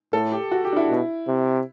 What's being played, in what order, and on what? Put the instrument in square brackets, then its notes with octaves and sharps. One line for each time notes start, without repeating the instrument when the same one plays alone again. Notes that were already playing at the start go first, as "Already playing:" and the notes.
[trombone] A2 [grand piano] A4
[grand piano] G4
F#4
G4
D4
E4
[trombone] B2
C3